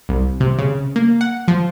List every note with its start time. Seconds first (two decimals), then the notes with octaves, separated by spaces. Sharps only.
0.09 C2
0.40 C3
0.59 C#3
0.96 A#3
1.21 F#5
1.48 F3